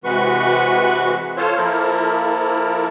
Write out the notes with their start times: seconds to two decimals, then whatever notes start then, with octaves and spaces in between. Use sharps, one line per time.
0.04 C3 E3 G#3 F#4 B4 C#6
1.37 F4 A4 C5 C#5
1.57 F3 A#3 E4 A4 A#4